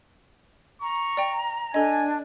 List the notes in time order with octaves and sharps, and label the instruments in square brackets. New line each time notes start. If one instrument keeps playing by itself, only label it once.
[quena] A#5 [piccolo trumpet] C#6
[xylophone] D5 G5
[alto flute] D4 [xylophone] A4 D#5 [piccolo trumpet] G#5